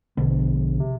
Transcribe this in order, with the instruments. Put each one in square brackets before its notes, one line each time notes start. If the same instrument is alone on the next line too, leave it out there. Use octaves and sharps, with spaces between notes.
[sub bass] A#1 [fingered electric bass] B2 D3 B3
[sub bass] C3